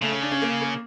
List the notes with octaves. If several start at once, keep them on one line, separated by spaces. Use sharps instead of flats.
C#3 A3
C#4
D4
C#4
A#3
A#3